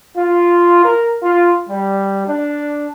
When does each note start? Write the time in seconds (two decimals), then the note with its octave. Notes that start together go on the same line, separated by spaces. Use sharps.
0.17 F4
0.84 A#4
1.23 F4
1.68 G3
2.28 D4